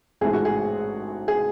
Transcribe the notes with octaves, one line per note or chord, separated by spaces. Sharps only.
A1 G#2 E3 A3 G#4
F#4
G#4
G#4